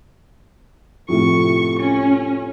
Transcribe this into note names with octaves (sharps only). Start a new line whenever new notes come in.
A2 C3 F3 C#6
C#4